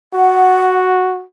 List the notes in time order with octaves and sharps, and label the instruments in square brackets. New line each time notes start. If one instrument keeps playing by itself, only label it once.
[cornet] F#4 [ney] F#5